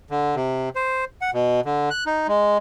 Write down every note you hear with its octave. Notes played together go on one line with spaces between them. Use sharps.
D3
C3
C5
F#5
B2
D3
F#6
D#4
G#3